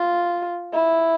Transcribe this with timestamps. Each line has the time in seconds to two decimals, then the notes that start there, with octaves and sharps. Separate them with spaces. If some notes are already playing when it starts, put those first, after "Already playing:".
Already playing: F4
0.73 E4